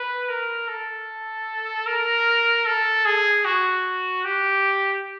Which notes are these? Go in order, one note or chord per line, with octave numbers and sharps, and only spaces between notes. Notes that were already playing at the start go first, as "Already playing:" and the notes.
Already playing: B4
A#4
A4
A#4
A4
G#4
F#4
G4